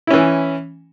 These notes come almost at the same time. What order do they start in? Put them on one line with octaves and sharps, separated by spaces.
E4 C#4 E3